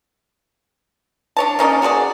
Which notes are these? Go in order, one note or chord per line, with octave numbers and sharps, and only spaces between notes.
D4 C#5 A5
A#3 C#4 D#4 D5
F#4 G#4 B4 D5